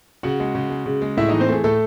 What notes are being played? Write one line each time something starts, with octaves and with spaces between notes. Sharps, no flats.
C#3 F#4 F#5
G#3
C#3
G#3
C#3
G#3
A2 E4 E5
E3 D#4 D#5
C4 C5
A3 G#4
A2 A3 A4